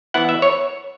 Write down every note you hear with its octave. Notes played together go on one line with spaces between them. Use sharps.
E3 B3 E4 F#5
E5
C#5